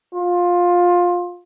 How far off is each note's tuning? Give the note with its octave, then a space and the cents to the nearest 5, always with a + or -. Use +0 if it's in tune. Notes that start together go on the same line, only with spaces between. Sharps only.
F4 +15